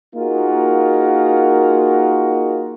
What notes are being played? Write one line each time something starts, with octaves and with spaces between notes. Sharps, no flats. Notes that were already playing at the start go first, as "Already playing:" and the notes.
A#3 D#4 F4 F#4 G#4 A#4